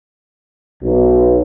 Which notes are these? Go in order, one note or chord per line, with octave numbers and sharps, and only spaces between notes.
B1